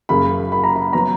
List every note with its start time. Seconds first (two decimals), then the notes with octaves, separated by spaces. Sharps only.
0.09 F#1 F#2 C#3 B5
0.52 B5
0.64 A#5
0.76 B5
0.93 F#3 B3 A#5